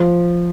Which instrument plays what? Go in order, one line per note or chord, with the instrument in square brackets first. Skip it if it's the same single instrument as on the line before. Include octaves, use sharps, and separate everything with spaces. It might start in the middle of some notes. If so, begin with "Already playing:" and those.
Already playing: [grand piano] F3